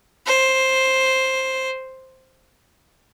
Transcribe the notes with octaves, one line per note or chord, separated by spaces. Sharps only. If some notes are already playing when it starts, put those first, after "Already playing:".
C5